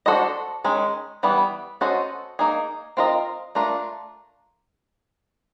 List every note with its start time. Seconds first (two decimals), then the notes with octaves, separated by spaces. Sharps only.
0.06 D4 F#4 A4 C5 D#5
0.64 D#3 G#3 C#4
1.23 E3 G3 B3
1.81 C#4 F#4 A4 C5 D#5
2.39 A#3 D#4 G#4
2.97 C4 F4 A#4 D#5
3.55 A3 D4 F4 A#4